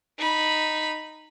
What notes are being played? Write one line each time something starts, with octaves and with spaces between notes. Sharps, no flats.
D#4 B5